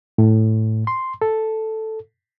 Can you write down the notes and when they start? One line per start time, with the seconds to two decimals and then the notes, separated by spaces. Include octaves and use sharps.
0.18 A2
0.87 C6
1.22 A4